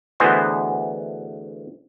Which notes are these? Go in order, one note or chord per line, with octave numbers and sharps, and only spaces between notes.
D2 E3 G#3 B3 C5